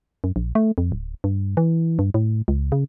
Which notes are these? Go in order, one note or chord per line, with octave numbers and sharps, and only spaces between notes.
F#2
A#1
A3
F2
D1
G2
E3
G2
A2
C#2
C#3